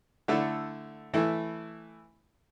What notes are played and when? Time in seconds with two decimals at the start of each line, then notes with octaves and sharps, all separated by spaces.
0.28 D3 A3 E4 A4
1.14 E3 A3 E4